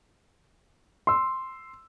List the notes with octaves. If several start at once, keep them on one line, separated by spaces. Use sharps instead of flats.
C6 E6